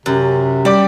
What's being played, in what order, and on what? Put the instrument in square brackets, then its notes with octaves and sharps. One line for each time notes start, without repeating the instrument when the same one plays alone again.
[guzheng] F#2 [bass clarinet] C3
[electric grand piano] G3 D5 D6 [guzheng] G4